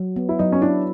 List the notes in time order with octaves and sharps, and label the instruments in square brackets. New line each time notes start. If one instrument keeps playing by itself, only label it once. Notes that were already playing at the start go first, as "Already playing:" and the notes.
Already playing: [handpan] F#3
B3
[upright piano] E4
[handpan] F#3 [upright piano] D#4
[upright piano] C#4
[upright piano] D4 [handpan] E4